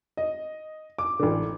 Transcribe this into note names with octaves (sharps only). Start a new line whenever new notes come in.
D#5
D6
A1 D3